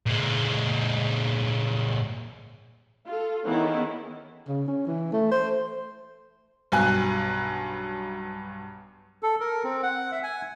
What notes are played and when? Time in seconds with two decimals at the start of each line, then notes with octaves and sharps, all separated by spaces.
0.06 A#2 G#3
3.07 F4 A4
3.46 D#3 E3 B3 C#4 E4 G#4
4.48 C#3
4.67 C#4
4.87 E3
5.13 A3
5.31 C5
6.72 B1 G2 F#3 G#5 F#6
9.23 A4
9.40 A#4
9.64 C4
9.83 F#5
10.12 E5
10.23 G#5